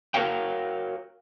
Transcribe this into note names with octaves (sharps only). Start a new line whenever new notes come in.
F#4 A#4 C#5 F5 G5